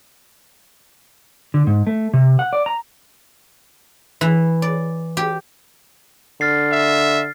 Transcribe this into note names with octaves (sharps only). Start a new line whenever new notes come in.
D3
G#2
A3
C3
F#5
D5
A#5
E3
D5
G4
D3 F6 A6 C7
E5